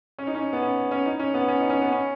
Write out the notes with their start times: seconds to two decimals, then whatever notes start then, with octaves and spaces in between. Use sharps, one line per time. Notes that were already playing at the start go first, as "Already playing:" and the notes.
0.18 C#4
0.27 D#4
0.35 C#4
0.53 B3
0.62 C#4
0.91 C#4
1.05 D#4
1.19 C#4
1.34 B3
1.48 C#4
1.59 D#4
1.70 C#4
1.81 B3
1.92 C#4